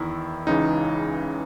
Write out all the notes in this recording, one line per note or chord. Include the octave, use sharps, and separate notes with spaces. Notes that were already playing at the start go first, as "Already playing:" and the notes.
Already playing: E2 D#3 E4
C#2 C#3 E3 D#4